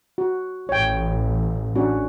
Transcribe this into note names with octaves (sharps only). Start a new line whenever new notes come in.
F#4
A1 C#5 G5
C#4 D4 F#4